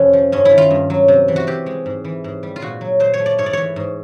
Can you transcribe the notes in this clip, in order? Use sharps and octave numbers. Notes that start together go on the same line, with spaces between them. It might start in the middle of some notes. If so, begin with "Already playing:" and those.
Already playing: F2 C3 A3 C#4
F3
G2 C#4
E4
D#3
F4
G2
F#3
C3
E3
F#4
C3 G4
G#3
G#2
E3
G#2
G3
F4
A#2 F#4
F#3
A#2 C5
C#5
A3
D5
G#2 C#5
D5
E3 C#5
G#2